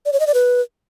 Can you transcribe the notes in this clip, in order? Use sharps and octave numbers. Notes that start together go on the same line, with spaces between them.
D5
C#5
D#5
D5
B4